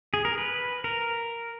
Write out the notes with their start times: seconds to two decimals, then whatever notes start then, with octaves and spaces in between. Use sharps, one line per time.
0.14 G#4
0.25 A#4
0.38 B4
0.84 A#4